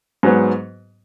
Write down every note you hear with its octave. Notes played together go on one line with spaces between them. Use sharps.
G#2 F#3 B3